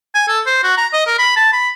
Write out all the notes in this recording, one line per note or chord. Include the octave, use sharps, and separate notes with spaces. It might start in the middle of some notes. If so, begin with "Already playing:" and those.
G#5
A4
C5
F#4
A#5
D#5
A#4
B5
A5
B5